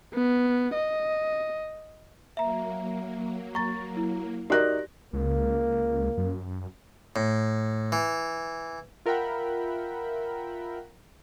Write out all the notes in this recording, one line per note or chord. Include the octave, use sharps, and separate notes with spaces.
B3
D#5
F#3 A#3 E5 A#5
A#5 C#6 A6
E4
D#4 F#4 G4 A#4 D5 F#6 A#6
C#2 A#3
F#2
A2
E3
F4 A#4 E5 F#5 G5 B5